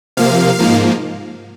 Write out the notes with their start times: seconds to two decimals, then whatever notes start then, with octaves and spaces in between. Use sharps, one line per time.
0.17 C3 F3 A#3 F5
0.59 G#2 F3 A#3